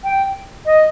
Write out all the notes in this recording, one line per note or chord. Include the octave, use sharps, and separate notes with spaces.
G5
D#5